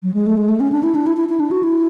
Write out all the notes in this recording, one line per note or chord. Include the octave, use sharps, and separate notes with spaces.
F#3
G#3
A3
G#3
A3
C#4
D4
E4
D4
E4
E4
E4
D4
F#4
E4